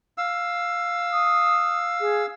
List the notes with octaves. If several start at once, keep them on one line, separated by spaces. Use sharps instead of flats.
F5 E6
D#6
G#4